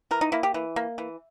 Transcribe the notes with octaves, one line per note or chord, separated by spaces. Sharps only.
E3 A#4
D#4
A#3 E4
G4
E3
A#3
E3